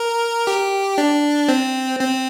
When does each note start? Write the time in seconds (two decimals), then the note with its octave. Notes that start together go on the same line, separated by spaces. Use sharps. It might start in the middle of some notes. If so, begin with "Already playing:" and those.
Already playing: A#4
0.47 G4
0.98 D4
1.48 C4
1.99 C4